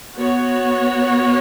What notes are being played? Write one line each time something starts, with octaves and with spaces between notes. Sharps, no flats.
B3 F#4 C#5